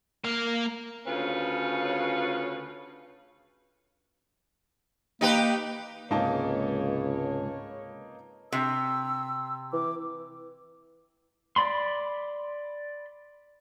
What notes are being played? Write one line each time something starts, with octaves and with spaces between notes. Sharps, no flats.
A#3 F5
D2 C#3 C#4 F4 B4
A#3 D#4 G4 B4
C#2 G#2 C3 A#3 D#4 B4 C#5 A5
C3 E6
E3 D6
D5 B5 C6